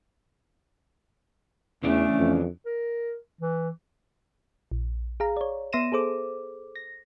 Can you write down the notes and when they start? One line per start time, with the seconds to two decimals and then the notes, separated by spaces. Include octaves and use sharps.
1.83 E2 C#3 E3 A3 C#4 D4
2.18 F2
2.65 A#4
3.41 E3
4.72 A#1
5.20 G#4 F5 A#5
5.37 C#5 D5
5.73 B3 E5 C6 A#6 D#7 E7
5.92 G#4 A4 C5 D6
6.76 A#6